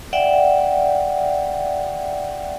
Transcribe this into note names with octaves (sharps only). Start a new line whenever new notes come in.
D5 E5 F#5 G5